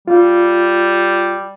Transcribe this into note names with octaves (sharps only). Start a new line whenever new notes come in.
G3 F4